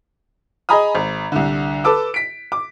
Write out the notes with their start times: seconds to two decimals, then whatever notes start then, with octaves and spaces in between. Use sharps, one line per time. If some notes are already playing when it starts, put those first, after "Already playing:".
0.69 G#4 D#5 G#5 A#5 B5 D#6
0.95 G#1
1.32 C2 D3
1.84 A4 B4 A5 D6 E6
2.14 B6 D7
2.52 D6